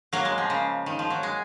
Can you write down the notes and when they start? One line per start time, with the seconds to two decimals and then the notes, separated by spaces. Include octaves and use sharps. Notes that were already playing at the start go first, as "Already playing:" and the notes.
0.13 F#3 A#3
0.25 G#3
0.38 F3
0.50 C#3
0.86 D#3
0.99 F3
1.10 F#3
1.23 G#3